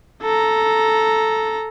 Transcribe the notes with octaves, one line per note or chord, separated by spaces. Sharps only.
A4 A#5